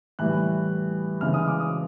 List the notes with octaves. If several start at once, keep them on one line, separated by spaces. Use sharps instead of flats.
A2 E3 G3 F#6
C#3 E3 G#3 F6
D#6
D6
D#6